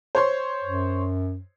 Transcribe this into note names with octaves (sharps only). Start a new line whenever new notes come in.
C5 C#5 C6
F#2